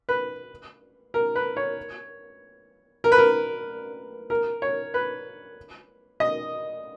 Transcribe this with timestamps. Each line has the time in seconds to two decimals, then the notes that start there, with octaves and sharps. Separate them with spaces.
0.09 B4
1.14 A#4
1.35 B4
1.57 C#5
3.04 A#4
3.12 B4
3.18 A#4
4.30 A#4
4.62 C#5
4.94 B4
6.20 D#5